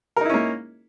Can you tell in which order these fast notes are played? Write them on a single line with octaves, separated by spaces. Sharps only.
A#4 D#4 E4 C#4 A#3